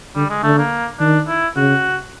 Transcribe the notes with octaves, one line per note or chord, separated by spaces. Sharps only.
D3 G3
G#3
D3 A3
A#3
D#3 D4
E4
C#3 F#4